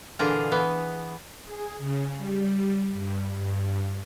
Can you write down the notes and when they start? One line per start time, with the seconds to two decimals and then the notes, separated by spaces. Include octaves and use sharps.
0.19 A#2 D3 E3 F4 G#4 A#5
0.52 E3 B3
1.45 G#4
1.78 C#3
2.15 G3
2.92 G2
3.34 G2